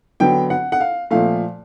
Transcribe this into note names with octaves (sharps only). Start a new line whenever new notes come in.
D3 F#3 B3 G5
F#5
F#5
F5
A#2 F3 A3 F5